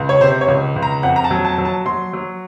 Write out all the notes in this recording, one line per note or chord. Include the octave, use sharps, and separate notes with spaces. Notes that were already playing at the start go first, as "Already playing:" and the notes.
Already playing: C#2
C#5
C3 C5
C#5
C#2
C#2
A#5
F2 F#5
A#5
A5
F#3
A5
F#3
A5
F#3 C6
F#3